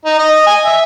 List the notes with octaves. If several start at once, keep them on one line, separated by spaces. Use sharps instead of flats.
D#4
D#5
G#5
E5